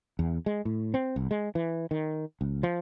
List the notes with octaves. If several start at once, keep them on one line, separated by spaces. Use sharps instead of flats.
E2
G#3
A2
C4
C2
G#3
E3
D#3
C#2
F3